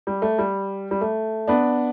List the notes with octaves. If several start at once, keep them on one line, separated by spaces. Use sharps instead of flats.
G3
A3
G3
G3
A3
B3 D4